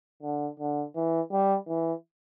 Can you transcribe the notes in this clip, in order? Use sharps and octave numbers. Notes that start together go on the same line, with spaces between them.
D3
D3
E3
G3
E3